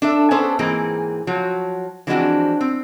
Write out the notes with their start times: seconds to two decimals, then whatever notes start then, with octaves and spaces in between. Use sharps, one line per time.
0.02 D4 A4 E5
0.31 B3 C#4 D4 G#4 A4 C5
0.59 G#2 E3 A#3 C4 G#4
1.27 F3 F#3
2.07 E3 F3 G#3 C4 D4 F#4
2.61 C4